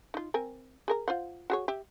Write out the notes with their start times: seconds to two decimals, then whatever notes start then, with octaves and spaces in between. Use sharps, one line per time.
0.14 D#4 F4
0.34 C4 A#4 G#5
0.88 G#4 A#4 A#5
1.08 F4 C5 F#5
1.50 F#4 G#4 C#5
1.68 G4 E5